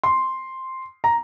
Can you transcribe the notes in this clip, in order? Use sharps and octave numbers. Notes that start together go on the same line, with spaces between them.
C6
A#5